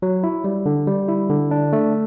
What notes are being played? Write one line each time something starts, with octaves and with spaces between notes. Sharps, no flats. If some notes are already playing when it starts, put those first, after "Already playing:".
F#3
E4
G3
D3
G3
E4
D3
D4
A3